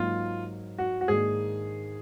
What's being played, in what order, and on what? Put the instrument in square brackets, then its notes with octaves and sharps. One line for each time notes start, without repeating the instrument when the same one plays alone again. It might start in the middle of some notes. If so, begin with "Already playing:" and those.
Already playing: [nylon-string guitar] G#2 F#3 A#3 [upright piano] F4
[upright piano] F#4
F#4
[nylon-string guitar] G#2 D#3 A#3 D4 [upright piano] G#4